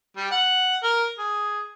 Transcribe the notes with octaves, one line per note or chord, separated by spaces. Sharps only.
G3
F#5
A#4
G#4